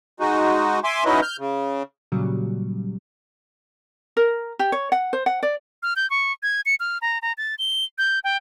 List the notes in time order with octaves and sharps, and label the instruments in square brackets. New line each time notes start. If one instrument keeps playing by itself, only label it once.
[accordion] G#3 D#4 F#4
E5 G#5 C6 D6
F#3 C#4 D#4 E4 B4 D#5
F6 G6
C#3
[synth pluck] A#2 C#3 F#3 G3
[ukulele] A#4
G4
C#5
F#5
C5
F#5
D5
[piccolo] F6
G6
C#6
G#6
C#7
F6
A#5
A#5
A6
G7
G6
G5